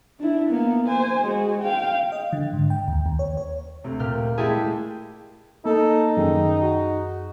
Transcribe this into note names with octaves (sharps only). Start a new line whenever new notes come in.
D4 E4
A#3 B3
C5 G#5
G#3 F#4
F5 G5
D#5
D3
G#2
G5
D#2
D#2
C#5
C#5
D2 C3
A#2 G4 F6
G#3 A3 E4 G4 G#4 A5
A#3 D#4 A4
F#2 D#3 G#4
F#4